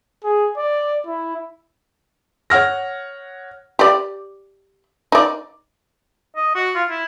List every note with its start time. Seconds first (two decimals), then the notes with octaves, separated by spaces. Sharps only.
0.24 G#4
0.57 D5
1.07 E4
2.50 C#5 F#5 F6 A#6
3.79 G4 D5
5.12 D#4 D5
6.36 D#5
6.55 F#4
6.75 F4
6.90 E4